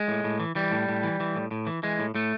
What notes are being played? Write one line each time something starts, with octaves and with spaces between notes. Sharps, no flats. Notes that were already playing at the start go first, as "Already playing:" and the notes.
Already playing: G#3
A2
A2
E3
E3 G3
A2
A2
E3
E3
A2
A2
E3
E3 G#3
A2
A2 A3